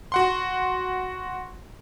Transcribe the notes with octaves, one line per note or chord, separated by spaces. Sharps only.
F#4 F#5 C6